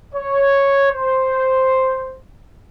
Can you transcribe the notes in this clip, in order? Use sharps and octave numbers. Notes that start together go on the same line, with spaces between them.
C#5
C5